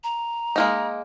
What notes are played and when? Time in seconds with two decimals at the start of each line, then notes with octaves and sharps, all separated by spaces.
0.04 A#5
0.56 G#3 A#3 D#4